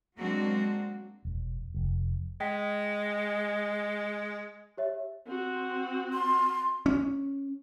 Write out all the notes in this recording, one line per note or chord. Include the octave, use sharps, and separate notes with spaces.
F#3 G#3 A#3 C4 D4 F#4
E1
F1
G#3 G5 B6
G4 C#5 E5
C4 F#4
C6
C#4